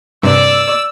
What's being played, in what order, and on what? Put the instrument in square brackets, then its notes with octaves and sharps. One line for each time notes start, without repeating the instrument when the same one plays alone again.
[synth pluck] G2 C3 [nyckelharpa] D5 [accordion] E6